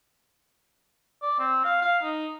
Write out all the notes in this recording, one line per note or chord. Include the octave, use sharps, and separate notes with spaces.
D5
C4
F5
F5
D#4